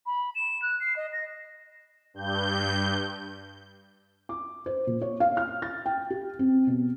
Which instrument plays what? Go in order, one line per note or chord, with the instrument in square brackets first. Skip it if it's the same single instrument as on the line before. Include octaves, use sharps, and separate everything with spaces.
[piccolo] B5
E7
F#6
C7
D#5
A#6
[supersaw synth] G2 G6
[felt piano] D6
C5
A#2
C#5
F5
F6
A6
G5
G4
C4
B2